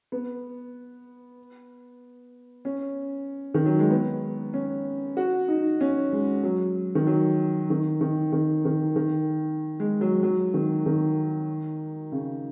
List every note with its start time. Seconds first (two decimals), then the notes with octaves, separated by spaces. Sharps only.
0.12 B3
2.65 C#4
3.54 D#3
3.66 F#3
3.79 G#3
3.90 B3
4.54 C#4
5.17 F#4
5.48 D#4
5.81 C#4
6.13 G#3
6.44 F#3
6.95 D#3
7.07 F#3
7.70 D#3
8.01 D#3
8.32 D#3
8.65 D#3
8.96 D#3
9.80 G#3
10.01 F#3
10.23 F#3
10.54 D#3
10.86 D#3
12.12 C#3